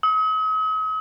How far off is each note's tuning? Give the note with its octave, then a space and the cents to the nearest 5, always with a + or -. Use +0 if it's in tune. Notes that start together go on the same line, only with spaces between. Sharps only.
D#6 +45